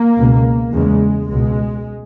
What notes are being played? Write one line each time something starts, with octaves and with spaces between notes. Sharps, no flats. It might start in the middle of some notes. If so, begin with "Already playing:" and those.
Already playing: A#3
C#2 B2
E2 C#3 G#3
C#2 B2 G#3